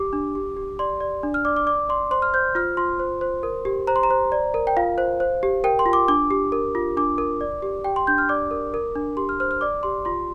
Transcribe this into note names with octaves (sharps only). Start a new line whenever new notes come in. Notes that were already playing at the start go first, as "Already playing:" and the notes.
Already playing: G4 D6
D4
G4
G4
D5 C6
D5
D4
F6
D5 D6
D6
D5 D6
D5 C6
C5 C6
F6
C5 G6
F4 F6
F4 C6
C5
C5
A#4
G4
C5 A#5
C6
A#5
C5
D5
A#4
G5
F4 F5
C5
C5
G4
A#4 G5
C6
F4
D6
D4 D6
G4
A#4
F4
D4 D6
A#4
D5
G4
G4 G5
C6
D4 G6
F6
D5 D6
A#4
A#4
D4
G4 C6
F6
C5 F6
F6
D5 D6
G4 C6
F4 C6